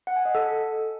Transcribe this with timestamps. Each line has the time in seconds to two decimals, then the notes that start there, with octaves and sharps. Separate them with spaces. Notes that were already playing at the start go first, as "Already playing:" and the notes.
0.07 F#5
0.16 G#5
0.25 D#5
0.35 A4